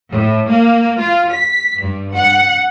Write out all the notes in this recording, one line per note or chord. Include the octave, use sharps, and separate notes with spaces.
A2
A#3
F4
B6
G2
F#5